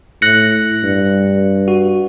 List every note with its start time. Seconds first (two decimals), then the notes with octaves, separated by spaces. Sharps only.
0.22 A2 F#6 A#6 C#7
0.83 G2
1.68 F#4